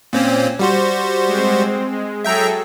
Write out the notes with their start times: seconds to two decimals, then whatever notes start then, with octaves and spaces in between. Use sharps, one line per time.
0.13 A#2 C4 C#4
0.59 G3 F#4 C5
1.27 G#3 C4
1.91 G#3
2.24 F#3 G#4 A4 E5 G5 A#5